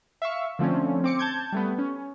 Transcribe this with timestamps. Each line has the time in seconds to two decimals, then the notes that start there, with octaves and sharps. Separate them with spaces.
0.22 E5 F5 C#6
0.59 D3 F3 A3 C4 C#4
1.04 C4 D6 C#7
1.19 A5 G6 G#6
1.52 G3 A3 B3
1.78 C#4